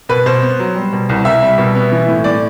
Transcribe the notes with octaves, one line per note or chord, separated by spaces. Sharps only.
B2 B4
B2 C5
B3
F#3
G3
B2
C2
C2 E5
G3
B2
B3
E3
A2
A2 D5